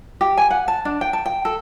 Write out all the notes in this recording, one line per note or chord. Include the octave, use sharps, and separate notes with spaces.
G4
G#5
F#5
A5
D4
G5
A5
G5
A4